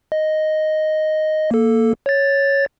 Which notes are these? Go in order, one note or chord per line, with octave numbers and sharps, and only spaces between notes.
D#5
A#3 A4
C#5 A6